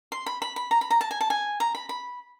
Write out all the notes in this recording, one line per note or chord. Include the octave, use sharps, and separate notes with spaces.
C6
B5
B5
B5
A#5
B5
A#5
A5
G#5
A5
G#5
A#5
B5
B5